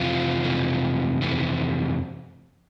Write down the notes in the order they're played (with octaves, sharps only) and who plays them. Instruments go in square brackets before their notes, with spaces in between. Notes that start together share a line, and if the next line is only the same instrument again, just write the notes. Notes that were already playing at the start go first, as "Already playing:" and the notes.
Already playing: [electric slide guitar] F2 C3 E3 F4
F2 C3 E3
F2 C3 E3